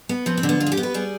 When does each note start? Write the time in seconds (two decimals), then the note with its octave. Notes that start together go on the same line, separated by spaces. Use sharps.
0.09 B3
0.26 F3 C4
0.37 C4
0.43 D3
0.49 B3
0.60 F2 F4
0.67 G#4
0.72 G4
0.77 B3
0.83 B4
0.94 G3 G#4